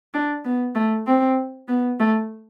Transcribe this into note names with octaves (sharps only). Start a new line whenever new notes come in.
D4
B3
A3
C4
B3
A3